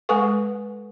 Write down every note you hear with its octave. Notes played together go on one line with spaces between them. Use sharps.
G#3 A4 B4 F#5 G#5 C#6